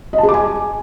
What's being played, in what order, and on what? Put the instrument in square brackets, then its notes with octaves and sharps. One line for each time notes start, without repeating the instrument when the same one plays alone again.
[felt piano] D#5
A5
G#4
D6
G#5